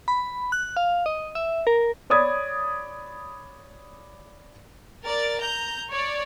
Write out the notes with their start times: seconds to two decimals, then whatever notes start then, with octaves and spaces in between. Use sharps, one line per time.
0.08 B5
0.52 F#6
0.77 F5
1.06 D#5
1.35 E5
1.67 A#4
2.10 C#5 D5 B5 D#6 G#6
5.04 A#4 D5 A6
5.40 A#5 G6
5.91 C#5 D5